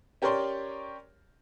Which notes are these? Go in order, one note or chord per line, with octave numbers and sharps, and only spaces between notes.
C#4 G4 A#4 C#5 D5 C6